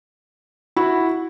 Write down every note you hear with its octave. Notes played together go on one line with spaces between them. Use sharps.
E4 F#4